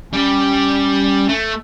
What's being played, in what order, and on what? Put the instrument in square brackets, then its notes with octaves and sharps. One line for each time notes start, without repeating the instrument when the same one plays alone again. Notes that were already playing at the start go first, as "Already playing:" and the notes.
[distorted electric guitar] G3 G4 [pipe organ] C#4
[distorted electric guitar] A3